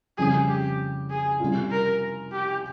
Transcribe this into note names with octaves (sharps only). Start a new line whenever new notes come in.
F2 C#3 G3 C4 G#4
G4
G#4
C3 G3 C#4 F4
A#4
G4